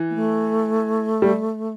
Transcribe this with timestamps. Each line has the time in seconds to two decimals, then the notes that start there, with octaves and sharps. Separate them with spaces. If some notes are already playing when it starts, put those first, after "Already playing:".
Already playing: E3
0.10 A#3
0.15 A3
1.22 G3